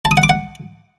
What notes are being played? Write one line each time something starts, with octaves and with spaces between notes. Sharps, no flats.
A5
D#6
F#5
D6
F#5